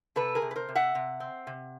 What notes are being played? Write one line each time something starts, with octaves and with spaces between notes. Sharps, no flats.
C3 A4 B4
G#4 A#4
C3
B4
A#4 C5
C3
E5 F#5
C3
C4
C3